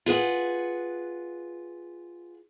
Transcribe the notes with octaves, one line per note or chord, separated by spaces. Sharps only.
F4 G#4 B4 F#5